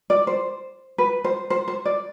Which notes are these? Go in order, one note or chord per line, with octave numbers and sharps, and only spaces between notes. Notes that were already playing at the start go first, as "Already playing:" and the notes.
D5
C5
B4
C5
C5
C5
D5